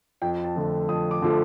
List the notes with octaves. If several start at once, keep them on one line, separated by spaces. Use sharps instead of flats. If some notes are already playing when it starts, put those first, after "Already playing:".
F2 G5
A5
D3 F3 A3
F2 D#6
D6
D3 F3 A3